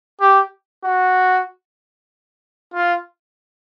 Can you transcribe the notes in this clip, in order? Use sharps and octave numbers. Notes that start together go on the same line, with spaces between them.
G4
F#4
F4